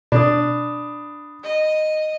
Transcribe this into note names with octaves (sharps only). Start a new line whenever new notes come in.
B2 D4 B5 D#6
D#5